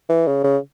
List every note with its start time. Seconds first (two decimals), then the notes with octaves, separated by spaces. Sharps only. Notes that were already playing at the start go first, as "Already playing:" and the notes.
0.09 E3
0.27 C#3
0.44 C#3